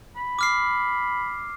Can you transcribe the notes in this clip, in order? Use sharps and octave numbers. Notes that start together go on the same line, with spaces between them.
B5
D6 F6 C7